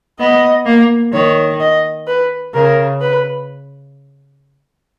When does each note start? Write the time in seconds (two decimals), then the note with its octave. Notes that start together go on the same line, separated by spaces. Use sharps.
0.19 B3 D#5
0.66 A#3
1.13 D#3 C#5
1.60 D#5
2.07 B4
2.54 C#3 A#4
3.01 B4